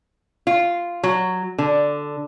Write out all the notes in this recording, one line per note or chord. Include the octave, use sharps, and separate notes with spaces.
F4
F#3
D3